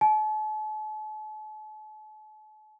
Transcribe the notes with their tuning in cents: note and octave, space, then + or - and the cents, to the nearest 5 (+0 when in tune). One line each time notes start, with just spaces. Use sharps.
A5 -40